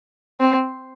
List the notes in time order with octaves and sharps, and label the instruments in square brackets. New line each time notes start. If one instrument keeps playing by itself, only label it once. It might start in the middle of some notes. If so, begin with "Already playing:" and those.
[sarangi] C4